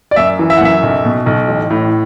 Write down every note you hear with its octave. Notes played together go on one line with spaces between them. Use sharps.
D5
F#2 E5
E3
E5
F#5
F#2 E5
B1
B2
B1
A1
A2